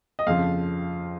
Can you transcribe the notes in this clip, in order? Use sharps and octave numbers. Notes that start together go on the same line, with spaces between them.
D#5
F2 C#3 F3 C4 F5